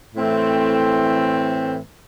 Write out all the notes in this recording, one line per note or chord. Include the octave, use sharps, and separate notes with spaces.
A2 E3 A3 C4